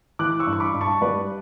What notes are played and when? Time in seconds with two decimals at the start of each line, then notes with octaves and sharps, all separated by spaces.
0.19 E3 D6 F#6
0.39 C#6 E6
0.47 G2
0.53 C#6
0.60 B5 D6
0.74 G2
0.81 A5 C#6
1.01 G3 B4 D5